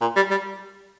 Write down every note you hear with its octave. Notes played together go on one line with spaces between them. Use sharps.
A#2
G3
G3